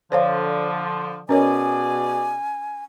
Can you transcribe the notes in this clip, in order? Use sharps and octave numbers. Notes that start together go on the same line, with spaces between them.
D3 F3 C5 C#5 F5
B2 C#4 G#4 A#4 C#5 D5 G#5